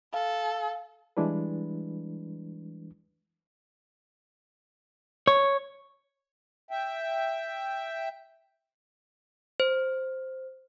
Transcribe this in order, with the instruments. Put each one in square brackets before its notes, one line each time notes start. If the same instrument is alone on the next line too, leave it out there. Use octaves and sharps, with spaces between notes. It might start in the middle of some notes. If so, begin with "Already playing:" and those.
[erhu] A4 [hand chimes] F5
[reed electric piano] E3 G3 G#3 D4 E4 B4
[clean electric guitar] C#5
[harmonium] E5 G5
[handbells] C5